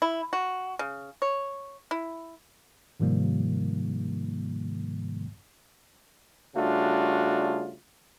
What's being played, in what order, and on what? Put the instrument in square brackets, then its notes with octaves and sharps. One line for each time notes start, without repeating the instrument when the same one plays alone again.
[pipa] E4
F#4
C#3
C#5
E4
[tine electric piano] G#2 C3 D#3 F3 G3 A#3
[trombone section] C#3 G3 A3 D4 F4 F#4